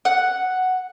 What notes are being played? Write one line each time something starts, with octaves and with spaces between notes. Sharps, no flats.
F#5